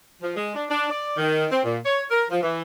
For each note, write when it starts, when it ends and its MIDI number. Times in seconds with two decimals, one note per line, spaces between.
0.22 0.33 53
0.37 0.50 56
0.54 0.64 62
0.70 0.90 62
0.90 1.13 74
1.17 1.46 51
1.51 1.62 60
1.64 1.78 46
1.86 2.03 73
2.11 2.24 70
2.30 2.41 53
2.42 2.62 52